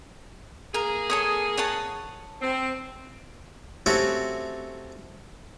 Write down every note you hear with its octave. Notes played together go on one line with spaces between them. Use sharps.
A#3 G#4 A#4
A4 C#5 D#6
C#5 F#5 A5
C4
A3 C4 C#4 F#4 G4 E5